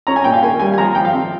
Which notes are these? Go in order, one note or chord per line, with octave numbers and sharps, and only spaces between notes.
C#4 A#5
G#5
A#2 G5
F5
A#3 G#5
G3 G#5
G#5
F3 A#5
F3 G5
F5
C4